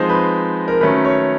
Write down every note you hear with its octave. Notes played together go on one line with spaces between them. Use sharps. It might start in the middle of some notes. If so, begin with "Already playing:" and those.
Already playing: F3 G#3 C4 D#4 C5
B4
A#4
D#3 F#3 A3 C#4 B4
C#5